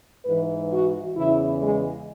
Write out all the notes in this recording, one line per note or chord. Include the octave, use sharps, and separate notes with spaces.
G#2 E3 B4
F#4
E2 C#3 E3 E4
G#3